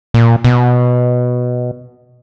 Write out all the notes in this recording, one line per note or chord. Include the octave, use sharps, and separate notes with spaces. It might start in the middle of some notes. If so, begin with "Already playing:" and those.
A#2
B2